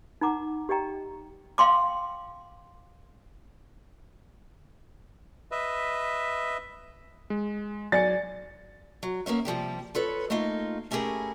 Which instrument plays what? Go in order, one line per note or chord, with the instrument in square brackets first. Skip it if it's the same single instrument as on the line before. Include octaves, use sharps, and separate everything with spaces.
[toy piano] D#4 F#5 A#5 D6
G4 D5 D#5 G5 A#5
F5 G5 C6 D6
[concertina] B4 D#5 E5
[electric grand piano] G#3
[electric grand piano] F#3 G#5 C#7 [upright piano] D5 [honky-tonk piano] A6
[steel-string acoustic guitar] F#3
A#3 B3 C#4 E5
C3 F3 G3 G4
F4 A4 B4 C#5
A3 A#3 D#4 F4
A3 C#4 E4 G4 G#4 A#4